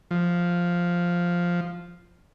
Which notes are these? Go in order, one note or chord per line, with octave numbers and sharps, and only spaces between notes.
F3